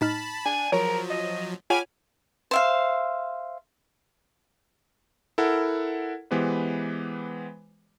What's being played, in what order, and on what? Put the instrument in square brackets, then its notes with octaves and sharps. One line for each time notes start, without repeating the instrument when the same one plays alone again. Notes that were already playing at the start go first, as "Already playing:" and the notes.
[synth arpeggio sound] A2 D#4 F6 [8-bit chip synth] A5 B5
[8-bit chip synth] D4 [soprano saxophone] G#5
[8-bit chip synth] F3 F#3 [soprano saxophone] A#4 [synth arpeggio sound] C#5
[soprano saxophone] D#5
[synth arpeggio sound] F4 C#5 F#5 [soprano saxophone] G#5 [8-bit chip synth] B5 D6 F6
[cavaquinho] C5 E5 F5
[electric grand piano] E4 A4 A#4 F#5
E3 G#3 B3 G4 B4 C5